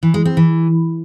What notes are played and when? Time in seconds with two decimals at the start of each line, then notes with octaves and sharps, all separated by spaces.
0.03 E3
0.14 G#3
0.25 C4
0.37 E3